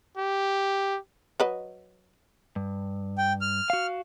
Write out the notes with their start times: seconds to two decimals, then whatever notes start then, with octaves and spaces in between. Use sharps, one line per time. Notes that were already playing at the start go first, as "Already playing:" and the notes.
0.18 G4
1.40 F#3 B4 D#5
2.56 G2
3.18 G5
3.41 F6
3.70 F#4 F5